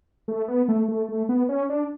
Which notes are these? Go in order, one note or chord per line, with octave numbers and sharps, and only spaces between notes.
A3
B3
A3
A3
A3
B3
C#4
D4